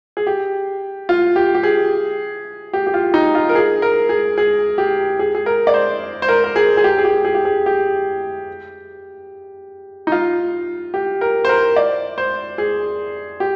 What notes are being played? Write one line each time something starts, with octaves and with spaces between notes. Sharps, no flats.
G#4
G4
F4
G4
G4
G#4
G4
G4
F4
D#4
F4
A#4
G#4
A#4
G#4
G#4
G4
G#4
G#4
A#4
D5
C5
C5
A#4
A#4
G#4
G#4
G4
G#4
G4
G#4
G4
G#4
G4
D#4
F4
G4
A#4
C5
A#4
D5
C5
G#4
G4